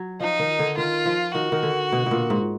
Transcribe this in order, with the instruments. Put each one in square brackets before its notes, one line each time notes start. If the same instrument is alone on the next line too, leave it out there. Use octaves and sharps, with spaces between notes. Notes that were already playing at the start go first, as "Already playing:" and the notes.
Already playing: [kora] F#3
[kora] F3 [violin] D#4
[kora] D#3
D3
[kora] D#3 [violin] F4
[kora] F3
[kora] D#3 [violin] F#4
[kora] D#3
D3
B2
B2
A#2
G#2